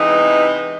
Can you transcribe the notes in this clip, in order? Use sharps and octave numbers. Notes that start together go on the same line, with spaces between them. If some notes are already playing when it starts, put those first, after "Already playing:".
Already playing: C3 E3 G#3 B3 D#4